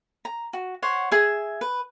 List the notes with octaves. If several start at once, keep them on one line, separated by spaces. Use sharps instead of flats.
A#5
F#4
C5 C#5 F#5
G#4 E5
B4